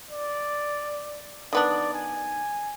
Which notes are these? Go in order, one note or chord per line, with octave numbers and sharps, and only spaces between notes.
D5
D#3 B3 D4 D5
G#5